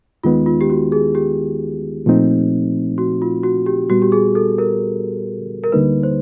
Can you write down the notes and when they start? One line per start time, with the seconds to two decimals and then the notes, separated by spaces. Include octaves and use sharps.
0.24 D#2 D#3 G#3 B3 D#4 F4
0.46 F4
0.61 G4
0.70 F#4
0.92 G#4
1.15 G4
2.06 A#2 F3 A3 C4 D#4
2.98 F#4
3.22 F4
3.43 F#4
3.66 G4
3.90 A#2 G3 B3 F#4
4.02 G4
4.12 G#4
4.35 A4
4.58 A#4
5.64 A#4
5.72 D2 D3 G3 A#3 D#4 B4
6.03 C5